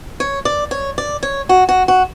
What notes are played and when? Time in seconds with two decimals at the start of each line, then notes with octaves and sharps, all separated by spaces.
0.20 C#5
0.45 D5
0.71 C#5
0.98 D5
1.23 C#5
1.49 F#4
1.69 F#4
1.88 F#4